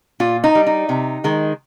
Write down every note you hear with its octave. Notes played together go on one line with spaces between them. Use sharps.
A#2 F4
D#4
G3
D#4
C3
D#3 G#3